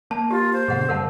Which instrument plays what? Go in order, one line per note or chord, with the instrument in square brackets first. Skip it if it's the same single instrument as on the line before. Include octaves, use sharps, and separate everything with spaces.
[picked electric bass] A#3 [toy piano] A5
[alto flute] F4 [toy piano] G4
[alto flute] C5
[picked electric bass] G2 B2 D3 [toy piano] G#4 F#5
[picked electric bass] F#2 C#3 G3 [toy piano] A#4 F#5 A5